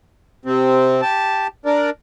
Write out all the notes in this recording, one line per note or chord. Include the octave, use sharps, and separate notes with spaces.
C3 C4
G4 A5
D4 A#4 D5